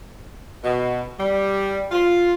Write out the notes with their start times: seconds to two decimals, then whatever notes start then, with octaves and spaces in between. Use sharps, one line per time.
0.64 B2
1.18 G3
1.91 F4